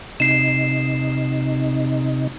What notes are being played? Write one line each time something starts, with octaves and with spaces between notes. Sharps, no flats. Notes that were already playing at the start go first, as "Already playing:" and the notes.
C3 D#4 C7 E7